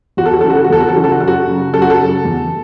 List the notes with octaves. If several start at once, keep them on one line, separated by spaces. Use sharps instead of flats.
E2 F#4
A4
F#4
C#3 E3 A4
F#4
A4
F#4
E2 A4
F#4
A4
C#3 E3 F#4
A4
F#4
F#2 A4
F#4
C#3 F#3
F#2 A4
F#4
A4
C#3 F#3
E2